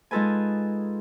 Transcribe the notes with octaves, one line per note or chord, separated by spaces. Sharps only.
G#3 D#4 F4 A4 B4 G#5